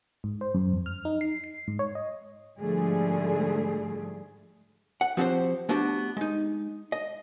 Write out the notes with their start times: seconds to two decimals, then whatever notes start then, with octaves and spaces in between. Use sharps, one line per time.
0.24 G#2
0.41 C5
0.54 F#2
0.73 F2
0.86 F6
1.05 D#4
1.21 C7
1.44 C7
1.68 G#2
1.79 C#5
1.95 D#5
2.59 G#2 D3 F3 G3 A3 G#4
5.01 F#5
5.17 F3 C4 F#4 G4 C5
5.69 A3 B3 D4 F#4 G4
6.17 G#3 D#4
6.92 D#5